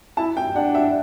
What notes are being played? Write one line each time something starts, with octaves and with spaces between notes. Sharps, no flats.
E4 A5
G5
D4 F#5
E5